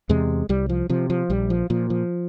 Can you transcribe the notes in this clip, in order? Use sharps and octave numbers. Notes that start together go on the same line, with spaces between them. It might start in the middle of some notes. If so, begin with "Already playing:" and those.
E2 C3 G#3
C2 G3
F3
C3 F3
F3
A#1 G3
F3
A#2 F3
F3